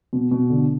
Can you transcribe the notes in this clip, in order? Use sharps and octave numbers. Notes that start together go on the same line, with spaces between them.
B2
B2
D3